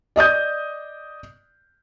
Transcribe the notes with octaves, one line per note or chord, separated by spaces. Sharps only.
D5 D#5 D#6 G6